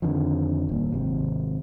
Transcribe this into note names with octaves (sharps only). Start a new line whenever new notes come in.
F2 D3 D#3 F3
D#1 A#2
G#1 C3